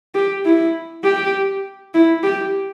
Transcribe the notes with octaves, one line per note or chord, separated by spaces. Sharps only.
G4
E4
G4
E4
G4